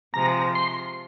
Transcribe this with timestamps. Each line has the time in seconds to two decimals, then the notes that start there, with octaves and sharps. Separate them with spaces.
0.14 C3 F3 G#3 A#5
0.55 C6